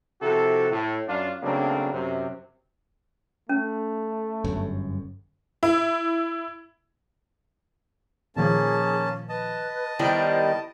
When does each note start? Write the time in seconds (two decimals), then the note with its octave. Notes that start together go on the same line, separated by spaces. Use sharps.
0.22 C3 F3 E4 F#4 A4
0.71 A2
1.08 F#2 D4 F4
1.42 C#3 F#3 A3 A#3 C4 D4
1.93 F#2 C3
3.49 A3 C#4
4.44 G1 F#2
5.63 E4
8.36 A#2 D#3 F3 A#3 C#4 G#4 A5
9.29 B4 D#5 A5
9.99 D#3 G3 B3 E4 C5 D7